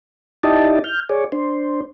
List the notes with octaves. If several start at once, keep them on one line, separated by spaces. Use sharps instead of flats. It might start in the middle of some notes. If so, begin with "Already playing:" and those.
D#4 E4 G4 D5 D#5 A5
F6 G6
G#4 C#5 D5
D4 C5